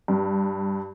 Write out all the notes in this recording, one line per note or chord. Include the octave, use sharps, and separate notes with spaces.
G2